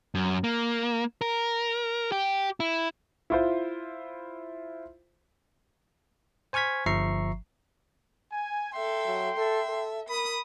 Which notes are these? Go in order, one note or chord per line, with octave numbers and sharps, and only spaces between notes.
F#2
A#3
A#4
G4
E4
E4 F4 C5
C5 G#5 C#6 F6 G#6 B6
G1 F3 E5 A#5 C#6 C7
G#5
A4 E5 G5 C6
F#3
A4 E5
A4
A#4 B5 D#6